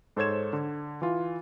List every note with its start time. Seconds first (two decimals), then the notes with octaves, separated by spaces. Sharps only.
0.17 G#2 A4 C5 C#5 G#6 E7
0.53 D3
1.02 E3 F4